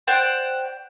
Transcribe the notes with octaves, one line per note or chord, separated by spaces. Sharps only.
C5 D5 F#5 G5